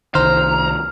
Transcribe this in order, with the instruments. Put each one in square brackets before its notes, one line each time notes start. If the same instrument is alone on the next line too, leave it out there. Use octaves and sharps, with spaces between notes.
[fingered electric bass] C2 D#3 [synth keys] C5 [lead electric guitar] A#5 [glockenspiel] F6